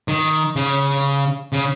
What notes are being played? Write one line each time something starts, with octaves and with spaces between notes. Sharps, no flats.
D#3
C#3
C#3